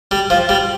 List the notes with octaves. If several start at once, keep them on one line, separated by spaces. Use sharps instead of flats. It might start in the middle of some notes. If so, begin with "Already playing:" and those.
G3
F3
G3